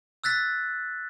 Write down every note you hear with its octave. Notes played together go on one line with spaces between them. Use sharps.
E6 F#6 A6 B6